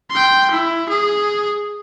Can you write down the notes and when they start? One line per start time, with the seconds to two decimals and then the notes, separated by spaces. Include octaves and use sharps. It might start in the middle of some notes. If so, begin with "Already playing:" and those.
0.11 G5 C6
0.51 E4
0.89 G#4